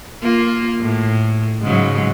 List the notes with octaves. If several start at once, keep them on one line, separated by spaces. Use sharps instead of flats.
A#3 F4
A2
G#2 C#3 F#3